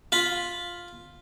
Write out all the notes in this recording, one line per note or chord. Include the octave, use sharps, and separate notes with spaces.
F4 B5